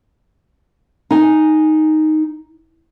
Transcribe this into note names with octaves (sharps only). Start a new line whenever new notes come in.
D#4 G#5